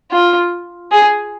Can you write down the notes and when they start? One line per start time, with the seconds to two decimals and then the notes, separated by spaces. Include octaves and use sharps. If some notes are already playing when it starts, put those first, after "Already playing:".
0.11 F4
0.92 G#4